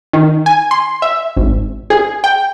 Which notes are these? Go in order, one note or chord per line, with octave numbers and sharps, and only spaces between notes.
D#3
G#5
C6
E5
G#1
G#4
G5